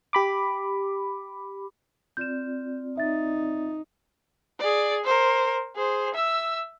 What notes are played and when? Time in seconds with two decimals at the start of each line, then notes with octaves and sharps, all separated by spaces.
0.13 G4 B5 D6
2.17 C4 F4 D5 G6 E7
2.97 D#4 E5 A6
4.60 G#4 D5
5.05 A#4 C5
5.76 G#4 C5
6.15 E5 E6